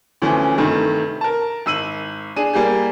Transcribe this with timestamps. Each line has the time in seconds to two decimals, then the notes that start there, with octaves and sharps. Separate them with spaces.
0.22 D2 E3 F3 C#4
0.58 G2 C3 D#3 A3
1.21 A#4 A5
1.66 G#1 E6 D#7 F#7
2.36 D4 G#4 D#7
2.54 G3 A#3 G4 G#4